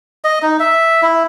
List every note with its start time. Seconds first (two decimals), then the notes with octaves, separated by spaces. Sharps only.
0.24 D#5
0.42 D#4
0.60 E5
1.03 E4